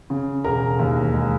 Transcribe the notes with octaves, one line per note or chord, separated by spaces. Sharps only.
C#3
E1 A#4 A#5
D#2
G#3